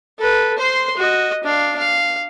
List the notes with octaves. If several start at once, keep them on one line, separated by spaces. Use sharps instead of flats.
A4 B4
C5 C6
F#4 D#5
D4 F5
F5